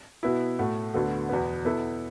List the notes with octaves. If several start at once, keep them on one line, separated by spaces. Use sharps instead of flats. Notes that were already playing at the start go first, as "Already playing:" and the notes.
B2 B3 E4
A2 A3 F#4
D2 D3 B3 F#4 A4
E2 B2 B3
B2 B3 E4 A4